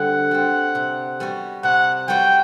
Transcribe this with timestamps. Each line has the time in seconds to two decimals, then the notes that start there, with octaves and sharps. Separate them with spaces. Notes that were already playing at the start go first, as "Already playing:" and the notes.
Already playing: D3 G3 C4 F#5
0.31 G3 C4
0.75 C3
1.20 G3 B3 F#4
1.63 C3 F#5
2.08 G3 B3 F#4 G5